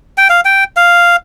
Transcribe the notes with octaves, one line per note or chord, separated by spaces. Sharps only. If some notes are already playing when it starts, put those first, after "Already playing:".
G5
F5
G5
F5